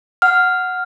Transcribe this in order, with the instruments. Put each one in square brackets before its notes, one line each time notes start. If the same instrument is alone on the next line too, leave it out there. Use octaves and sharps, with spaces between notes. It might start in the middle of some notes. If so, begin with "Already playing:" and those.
[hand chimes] F#5 F6